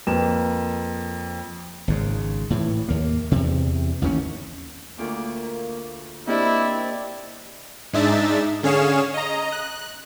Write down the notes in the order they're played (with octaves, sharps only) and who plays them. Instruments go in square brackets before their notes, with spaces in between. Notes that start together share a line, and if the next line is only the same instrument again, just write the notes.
[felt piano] F2 A#3 B4 E7
[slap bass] G#1 G#2 C#3
A2 E3
D#2 A#3
E2 C3
A1 D#2 D#3 C#4
[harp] D2 F4 D6 [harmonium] A#3
[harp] A#3 G4 D#5 [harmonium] C4 D4 D5 [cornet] E4
[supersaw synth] G#2 G#3 D4 D#4 E5 A6
D3 C#4 G#4 C#5 F5 E7
D#5 A#5
F#6